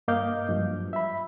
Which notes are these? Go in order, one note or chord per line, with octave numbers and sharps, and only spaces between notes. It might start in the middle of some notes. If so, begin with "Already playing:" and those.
G2 A#3 D#5 F5 D6 G6
G2 F3 F#3
E5 B5